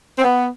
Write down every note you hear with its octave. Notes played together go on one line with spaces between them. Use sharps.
C4
B3